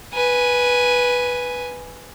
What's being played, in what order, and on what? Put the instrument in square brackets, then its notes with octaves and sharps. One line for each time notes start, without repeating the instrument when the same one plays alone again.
[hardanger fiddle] B4 G#5